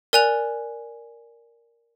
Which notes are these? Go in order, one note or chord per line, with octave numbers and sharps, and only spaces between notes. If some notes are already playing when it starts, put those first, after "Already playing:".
A#4 D5 G#5 F#6 F7